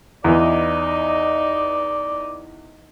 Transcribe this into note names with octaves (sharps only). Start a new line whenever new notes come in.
E2 E3 D#4 D5 D#5